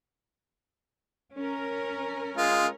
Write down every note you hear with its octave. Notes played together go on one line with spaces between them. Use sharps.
C#4 A#4
G#3 F4